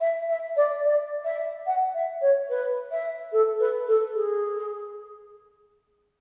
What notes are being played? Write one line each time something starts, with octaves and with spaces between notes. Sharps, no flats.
E5
E5
D5
D5
E5
F#5
E5
C#5
B4
E5
A4
B4
A4
G#4